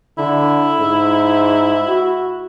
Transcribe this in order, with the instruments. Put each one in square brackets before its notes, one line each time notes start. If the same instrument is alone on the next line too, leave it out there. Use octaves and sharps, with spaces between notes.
[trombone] D3 [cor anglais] E4
[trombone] G#2
F#4